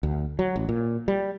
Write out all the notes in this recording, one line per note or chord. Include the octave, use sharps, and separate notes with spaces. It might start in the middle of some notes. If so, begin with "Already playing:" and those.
D2
F#3
A1
A#2
G3